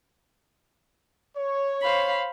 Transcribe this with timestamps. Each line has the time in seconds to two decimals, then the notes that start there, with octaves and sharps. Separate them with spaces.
1.37 C#5
1.82 C5 F5 B5